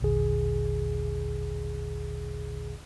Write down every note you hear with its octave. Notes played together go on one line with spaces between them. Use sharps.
A1 D#2 A#2 D3 G#4